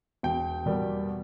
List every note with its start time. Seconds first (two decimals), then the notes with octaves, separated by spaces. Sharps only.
0.23 E1 G5
0.66 E2 B2 G3 A#3